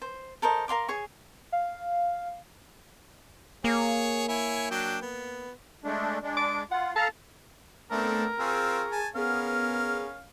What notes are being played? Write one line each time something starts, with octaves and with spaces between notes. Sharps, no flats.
C5
A4 A#4 C5 D#5
A#4 F5 C6 D6
G#4 C#5 C#6
F5
A#3 G#4 C#5
E4 C#5 G#5
F#3 D4 G5
B3
G#3 A3 D4
G#3 D4
D6
F4 F#5
A4 F5 A5 A#5
A3 B3 C4 D4 A4 A#4
C4 F4 G#4 C#6 E6
G#5 A5
B3 C#4 G#4 A#4 F5